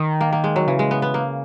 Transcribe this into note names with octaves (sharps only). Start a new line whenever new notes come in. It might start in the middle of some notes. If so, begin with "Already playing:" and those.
Already playing: D#3
A#3
A#3
G#3
F#3
C#3 E3
G#3
B3
B3
A#3